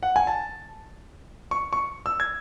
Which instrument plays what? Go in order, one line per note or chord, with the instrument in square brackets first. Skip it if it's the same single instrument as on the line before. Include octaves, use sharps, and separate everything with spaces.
[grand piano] F#5
G#5
A5
C#6
C#6
E6
G#6